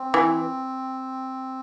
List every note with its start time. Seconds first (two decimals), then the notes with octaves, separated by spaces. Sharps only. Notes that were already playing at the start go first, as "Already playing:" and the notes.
Already playing: C4
0.14 E3